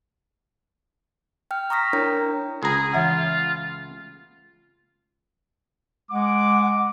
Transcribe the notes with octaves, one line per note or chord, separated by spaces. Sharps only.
G5 F6
A#5 C#6 D#6 F6 A#6 B6
D4 E4 A#4 C#5 G5 A#5
C#2 G#4 A#5
E3 F4 E5 F#5
G#3 F#5 D6